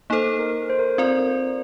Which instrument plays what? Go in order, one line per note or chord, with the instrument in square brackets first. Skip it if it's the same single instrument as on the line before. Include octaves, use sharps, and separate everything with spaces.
[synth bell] A#3 D#4 A4 C5
[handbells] A#4
C5
A#4
C5
[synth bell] C4 F4 A#4 D5